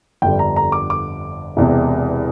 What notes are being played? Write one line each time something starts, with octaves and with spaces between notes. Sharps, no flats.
G1 F2 D3 G3 G5
A#5
A#5
D6
D6
E1 E2 C3